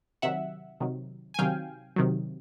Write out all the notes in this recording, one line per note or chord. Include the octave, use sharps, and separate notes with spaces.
C3 D#3 F#3 E5 F#5
C3 D#3 F#3
G#5
C3 D#3 F#3 F5 G5
C3 D#3 F#3